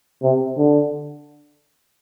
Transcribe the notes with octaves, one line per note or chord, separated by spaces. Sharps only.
C3
D3